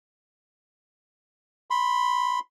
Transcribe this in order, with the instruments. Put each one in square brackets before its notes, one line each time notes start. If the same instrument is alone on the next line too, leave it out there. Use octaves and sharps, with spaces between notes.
[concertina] B5 C6